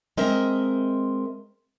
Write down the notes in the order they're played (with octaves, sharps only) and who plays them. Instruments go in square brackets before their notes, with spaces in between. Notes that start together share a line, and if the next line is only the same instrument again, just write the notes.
[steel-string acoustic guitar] G#3 C4 A#4 D#5 E5